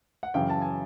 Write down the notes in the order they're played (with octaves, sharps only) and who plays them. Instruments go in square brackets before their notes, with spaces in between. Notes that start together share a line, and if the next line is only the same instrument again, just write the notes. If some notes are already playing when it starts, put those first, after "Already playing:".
[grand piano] F#5
F#2 C#3 E3 F5 G5
A5
G#5